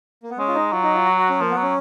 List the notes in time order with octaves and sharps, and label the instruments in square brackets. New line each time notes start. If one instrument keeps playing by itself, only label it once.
[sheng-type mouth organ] A#3
B3
[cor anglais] G#3 [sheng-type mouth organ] C#4
[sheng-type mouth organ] F4
D#4
[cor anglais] F#3 [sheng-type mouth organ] F4
[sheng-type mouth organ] D#4
F4
F#4
F#4
C#4
[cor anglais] F3 [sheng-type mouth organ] A#3
[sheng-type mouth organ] B3
[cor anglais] F#3
[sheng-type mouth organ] C#4